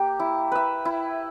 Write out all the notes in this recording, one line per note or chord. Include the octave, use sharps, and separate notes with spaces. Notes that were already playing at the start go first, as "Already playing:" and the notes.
Already playing: A#3 G4
E4
B4 E5
E4